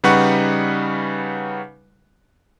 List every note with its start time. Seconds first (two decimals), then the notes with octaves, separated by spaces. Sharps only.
0.04 C#3 G3 D#4 B4 F#5 C#6